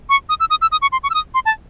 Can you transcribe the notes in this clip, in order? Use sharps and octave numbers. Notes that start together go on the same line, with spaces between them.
C#6
D#6
E6
D#6
E6
D#6
C#6
C6
C#6
E6
D#6
C6
A5